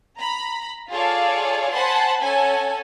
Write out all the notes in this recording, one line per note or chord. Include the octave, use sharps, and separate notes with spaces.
A#5 B5
F4 G#4 A4 C#5 D5 F5
C5 F#5 G#5 A5 B5 C6
C#4 A4 F#5 G#5